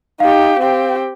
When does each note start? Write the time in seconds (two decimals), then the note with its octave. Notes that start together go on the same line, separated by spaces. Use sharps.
0.20 D#4 G4 F5
0.59 C4 G4